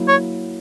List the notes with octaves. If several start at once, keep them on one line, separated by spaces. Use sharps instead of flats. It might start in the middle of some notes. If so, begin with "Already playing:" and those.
Already playing: F#3 A#3 E4
C#5